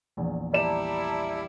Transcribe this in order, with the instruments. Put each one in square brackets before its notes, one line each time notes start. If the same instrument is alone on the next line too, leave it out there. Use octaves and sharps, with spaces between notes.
[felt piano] A#1 E2
[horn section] G3 E4 [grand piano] D5 E7 [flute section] E5 A5 A#5